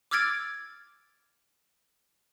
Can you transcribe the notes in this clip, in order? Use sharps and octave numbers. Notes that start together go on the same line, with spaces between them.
D6 E6 F6 G#6 A6 D7